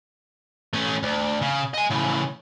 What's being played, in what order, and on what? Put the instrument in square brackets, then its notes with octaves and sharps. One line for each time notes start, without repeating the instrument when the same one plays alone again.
[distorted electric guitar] A3 C#4
D2
C#3
D#5 G#5
A2 C#3